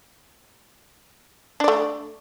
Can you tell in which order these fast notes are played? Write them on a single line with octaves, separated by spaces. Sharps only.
D4 D5 A3